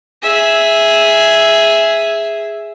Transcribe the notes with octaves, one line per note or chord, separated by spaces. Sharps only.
G#4 E5